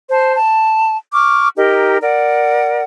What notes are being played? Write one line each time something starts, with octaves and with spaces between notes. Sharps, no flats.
C5 A5
A5
C#6 D6 F6
D#4 G4 A#4 D#5
A#4 D5 F#5